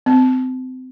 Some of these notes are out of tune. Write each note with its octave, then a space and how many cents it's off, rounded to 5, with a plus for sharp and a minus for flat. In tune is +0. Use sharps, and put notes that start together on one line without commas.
C4 -30